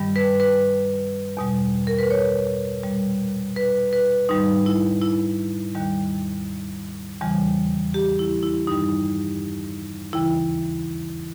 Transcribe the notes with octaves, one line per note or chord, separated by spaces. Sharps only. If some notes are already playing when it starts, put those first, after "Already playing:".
Already playing: G2 D#3 G3
B4
B4
E2 B2 G3
A#4
B4
C#5
A#2 G3
B4
B4
G#2 D#3 G3 D#4
E4
E4
D#2 D#3 G3
E2 C#3 E3 G3
G4
E4
E4
G2 D#3 G3 D#4
D#2 C#3 E3 E4